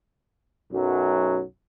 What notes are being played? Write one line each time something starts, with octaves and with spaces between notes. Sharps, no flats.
B1 F#2 F#3